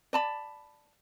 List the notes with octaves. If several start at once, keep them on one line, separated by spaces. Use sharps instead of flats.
D5 A5 B5